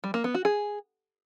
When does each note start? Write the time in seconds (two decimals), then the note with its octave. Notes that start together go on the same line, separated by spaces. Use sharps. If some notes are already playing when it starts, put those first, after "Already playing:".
0.04 G3
0.14 A#3
0.24 B3
0.35 F#4
0.45 G#4